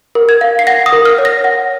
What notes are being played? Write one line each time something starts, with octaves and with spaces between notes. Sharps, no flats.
A#4
G#6
F5
C7
F#5 A#6
D#6
A#4
F6
C#5
A#6
F#5